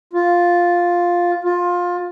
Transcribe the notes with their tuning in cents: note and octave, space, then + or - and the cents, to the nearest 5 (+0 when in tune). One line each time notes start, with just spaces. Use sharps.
F4 +5
F4 +20